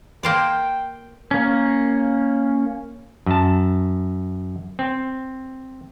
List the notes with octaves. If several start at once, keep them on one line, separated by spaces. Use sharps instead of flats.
A#3 C5 D5 G5
A#3 C#4
F#2 A5
C4